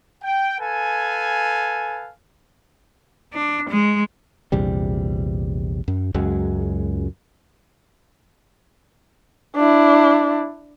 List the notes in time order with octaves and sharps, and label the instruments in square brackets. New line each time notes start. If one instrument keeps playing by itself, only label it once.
[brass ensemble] G5
A4 B4 F5 G#5
[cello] D4
G#3
[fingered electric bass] A#1 E2 C3 G3
F#2
C#2 F#2 F#3 G#3
[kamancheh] D4 E4